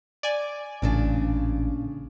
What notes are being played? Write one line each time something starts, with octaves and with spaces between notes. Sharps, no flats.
D5 G#5
A1 A#2 C#3 D4